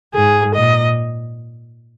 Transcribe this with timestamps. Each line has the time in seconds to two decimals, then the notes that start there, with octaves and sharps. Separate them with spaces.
0.14 G#2 G#4
0.55 A#2 D#5